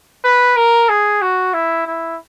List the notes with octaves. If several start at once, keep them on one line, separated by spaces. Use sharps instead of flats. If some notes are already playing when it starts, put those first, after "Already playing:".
B4
A#4
G#4
F#4
E4
E4